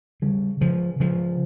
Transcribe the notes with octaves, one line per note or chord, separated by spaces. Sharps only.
C#3 G3
C#3 F3
C#3 F3